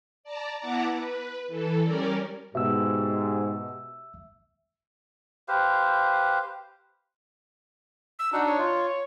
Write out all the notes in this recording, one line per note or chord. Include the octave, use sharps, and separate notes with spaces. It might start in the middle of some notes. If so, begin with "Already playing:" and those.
D5 A5 A#5
B3 E4 F#5 A5 A#5 D6
B4
E3 A4
G3 C#4 A#4 D5
G#2 B2 G4 E5 E6
G4 B4 C5 F5
E6
D4 D#4 F#4
C#5
F4